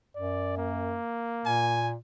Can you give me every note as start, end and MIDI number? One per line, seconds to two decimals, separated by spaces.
0.16 0.99 42
0.16 0.54 74
0.58 1.82 58
1.45 1.95 46
1.45 1.90 80